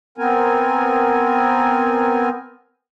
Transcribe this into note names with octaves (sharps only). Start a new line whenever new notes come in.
B3 C4 A#4 G#5